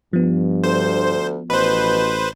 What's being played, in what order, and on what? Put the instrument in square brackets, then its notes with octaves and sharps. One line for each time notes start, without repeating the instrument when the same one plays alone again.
[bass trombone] G2 [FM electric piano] F3 B3
[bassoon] D2 [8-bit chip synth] C5
[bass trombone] A1 [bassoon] B2 [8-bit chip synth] B4 C5